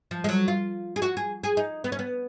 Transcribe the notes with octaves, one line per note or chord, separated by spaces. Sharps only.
F3
G#3
F#3
F4
G#4
F#4
G#4
G#4
D#4
B3
C#4
B3